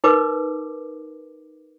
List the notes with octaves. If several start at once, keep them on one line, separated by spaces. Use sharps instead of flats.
D#4 A#4 B4 D6